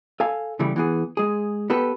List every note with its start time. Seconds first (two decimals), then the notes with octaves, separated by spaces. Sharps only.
0.20 A4 F5 G#5
0.59 C#3 E3 G3 A3
0.76 E3 B3 G#4
1.17 G#3 G#4
1.70 B3 G4 A4 B4